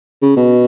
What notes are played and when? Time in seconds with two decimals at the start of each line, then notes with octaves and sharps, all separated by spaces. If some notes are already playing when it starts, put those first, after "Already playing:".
0.22 C#3
0.36 B2